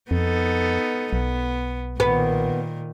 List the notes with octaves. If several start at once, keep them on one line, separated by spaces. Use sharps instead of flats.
F2 B3 D#4 A4
B1 B3
A#2 D#3 B3